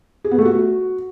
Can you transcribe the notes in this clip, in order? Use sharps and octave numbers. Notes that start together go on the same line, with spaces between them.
G#4
B3
A3
F#4